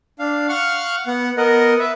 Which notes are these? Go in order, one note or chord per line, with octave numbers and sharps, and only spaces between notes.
D4 F5
F5 F#5 C#6 F6
B3 F#5
B3 A#4 D#5 F#5
B4 E5